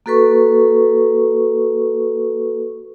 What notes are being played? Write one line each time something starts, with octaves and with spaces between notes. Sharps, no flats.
A#3 F#4 A4 B4 C#6